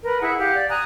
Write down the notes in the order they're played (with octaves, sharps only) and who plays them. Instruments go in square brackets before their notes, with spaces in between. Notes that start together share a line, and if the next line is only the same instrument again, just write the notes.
[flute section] A#4 B4
E4 G#4 F#5
G4 F5 F#5
D5
G#5 A#5 D#6 F#6